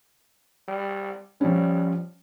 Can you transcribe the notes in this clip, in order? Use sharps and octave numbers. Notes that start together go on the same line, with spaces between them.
G3
F3 G3 C#4